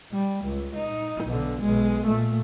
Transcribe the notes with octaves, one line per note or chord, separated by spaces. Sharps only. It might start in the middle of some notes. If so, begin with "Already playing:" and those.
G3
C#2
D#4
B1 D3
B1 G#3
A#2 A3